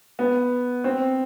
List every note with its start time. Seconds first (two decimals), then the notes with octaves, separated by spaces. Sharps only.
0.19 B3
0.84 C4